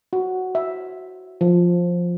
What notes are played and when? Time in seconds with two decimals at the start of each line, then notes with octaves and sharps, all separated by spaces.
0.13 F#4
0.55 E5
1.41 F3